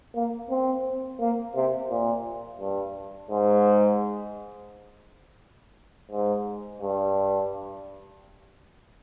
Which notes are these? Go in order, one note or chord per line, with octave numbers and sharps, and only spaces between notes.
A#3
C4
A#3
C3
A#2
G2
G#2
G#2
G2